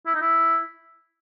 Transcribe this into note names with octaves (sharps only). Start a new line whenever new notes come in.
E4
D#4
E4